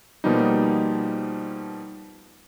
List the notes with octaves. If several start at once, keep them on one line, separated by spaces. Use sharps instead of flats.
B2 F3 G3 A#3 B3 D#4